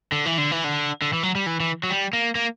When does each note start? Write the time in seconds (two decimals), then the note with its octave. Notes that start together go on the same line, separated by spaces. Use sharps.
0.12 D3
0.26 E3
0.38 D3
0.51 E3
0.64 D3
1.02 D3
1.13 E3
1.23 F#3
1.35 G3
1.46 E3
1.60 E3
1.83 F#3
1.90 G3
2.13 A#3
2.35 A#3